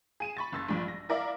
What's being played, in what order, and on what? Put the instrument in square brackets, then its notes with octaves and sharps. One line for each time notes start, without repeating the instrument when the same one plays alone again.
[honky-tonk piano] G#4 D#7 E7
B5 C#6 A6
F#1 E6 A6
A#1 G2 F3
A#6
E4 A#4 D5 E5 F5